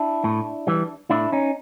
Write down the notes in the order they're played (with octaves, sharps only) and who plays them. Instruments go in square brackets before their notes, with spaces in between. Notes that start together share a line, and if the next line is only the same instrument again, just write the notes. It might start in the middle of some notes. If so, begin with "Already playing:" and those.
Already playing: [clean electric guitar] D4 E4
A2
E3 G3
A2 D4 E4
C#4 D#4